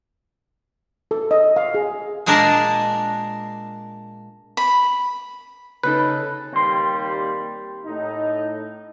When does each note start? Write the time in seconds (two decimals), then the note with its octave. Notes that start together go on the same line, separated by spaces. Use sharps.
1.11 A4
1.31 D#5
1.56 F5
1.74 G#4
2.26 A#2 G#3 D4 A#4 D5 A5
4.57 B5
5.83 C#3 D#4 A4 B4
6.52 D#2 G3 A#3 C4 C6
7.84 A2 D#4